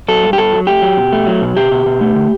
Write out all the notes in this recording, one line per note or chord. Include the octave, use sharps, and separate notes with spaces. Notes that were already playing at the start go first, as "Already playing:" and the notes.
F#3 A4
G2
G4
G2 A4
F#3
A3 G4
F#3
B2
A3
F#3
B2
B2 G4
B2
B2
A3
D3